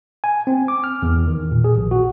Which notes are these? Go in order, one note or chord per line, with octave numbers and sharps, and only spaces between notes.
G#5
C4
D6
F6
E2
D#3
A#2
G#4
A#1
F#4